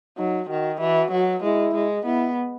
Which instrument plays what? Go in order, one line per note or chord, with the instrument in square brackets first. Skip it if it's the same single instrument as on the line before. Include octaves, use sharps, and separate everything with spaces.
[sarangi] F#3 [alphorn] D#4
[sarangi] D#3 [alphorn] F#4
[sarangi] E3 [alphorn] F#4
[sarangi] F#3
[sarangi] G#3 [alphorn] E4
[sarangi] G#3
[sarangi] B3 [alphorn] E4